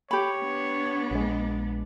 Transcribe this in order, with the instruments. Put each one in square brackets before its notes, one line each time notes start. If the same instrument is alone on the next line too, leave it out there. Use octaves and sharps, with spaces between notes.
[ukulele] G4 B5 [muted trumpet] C#5
[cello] B3 D4
[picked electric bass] A#1 G#3